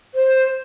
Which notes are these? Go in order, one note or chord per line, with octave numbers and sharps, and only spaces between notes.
C5